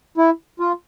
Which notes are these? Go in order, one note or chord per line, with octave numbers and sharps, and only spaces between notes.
E4
F4